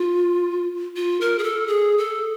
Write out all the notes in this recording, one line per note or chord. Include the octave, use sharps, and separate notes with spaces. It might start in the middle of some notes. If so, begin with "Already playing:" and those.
Already playing: F4
F4
A#4
G#4
A4
G#4
A4